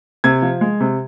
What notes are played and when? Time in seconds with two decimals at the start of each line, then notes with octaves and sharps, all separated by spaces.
0.24 C3 G#6
0.42 F3
0.61 G#3
0.80 C3